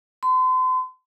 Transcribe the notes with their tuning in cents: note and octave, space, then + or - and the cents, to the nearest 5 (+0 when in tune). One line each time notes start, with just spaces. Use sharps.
C6 -40